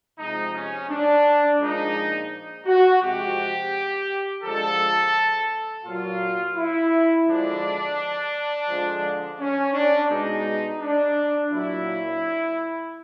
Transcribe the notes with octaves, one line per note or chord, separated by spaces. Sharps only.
C3 F3 G#3 D#4
C#4
D4
A#2 F3 G#3 D#4
F#4
C3 F3 G#3 G4
D3 F3 G#3 A4
A#2 F#3 F4
E4
D3 F3 G#3 D4
D3 F3 G#3
C#4
D4
B2 G#3 D#4
D4
A#2 F#3 E4